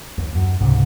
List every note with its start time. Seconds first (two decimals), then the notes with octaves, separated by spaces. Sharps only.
0.18 D#2
0.35 F#2
0.61 C#2 G#2 C3